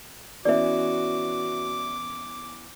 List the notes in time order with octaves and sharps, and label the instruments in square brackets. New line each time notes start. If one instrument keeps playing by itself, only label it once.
[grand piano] E3 B3 C#4 [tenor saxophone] F#4 [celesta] D5 E5 [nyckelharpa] D6